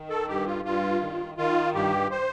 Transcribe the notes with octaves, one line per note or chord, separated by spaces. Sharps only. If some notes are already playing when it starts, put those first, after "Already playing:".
Already playing: D#3
A4
G2 G4
F4
G2 F4
D#3
D#3 F4
G2 G4
C5